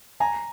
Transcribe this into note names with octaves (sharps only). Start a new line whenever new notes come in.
G#5 A#5